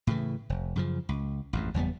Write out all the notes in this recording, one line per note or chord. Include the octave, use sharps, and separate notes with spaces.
A2 C#3 E3
F1
F#2 C#3 F3
C#2
A1 F2 G#2
F#1 E2 G3 B3